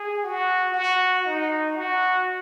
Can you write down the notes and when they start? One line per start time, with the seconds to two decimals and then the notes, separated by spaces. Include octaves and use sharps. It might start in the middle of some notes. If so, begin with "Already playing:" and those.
Already playing: G#4
0.24 F#4
0.74 F#4
1.26 D#4
1.76 F#4